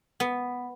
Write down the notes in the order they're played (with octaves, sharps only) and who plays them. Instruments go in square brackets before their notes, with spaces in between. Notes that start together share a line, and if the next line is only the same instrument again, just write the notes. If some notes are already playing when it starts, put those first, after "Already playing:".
[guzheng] B3